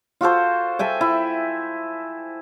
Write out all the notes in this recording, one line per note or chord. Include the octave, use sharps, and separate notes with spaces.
F4 F#4 A4 C5
A4 E5 G5 G#5
E4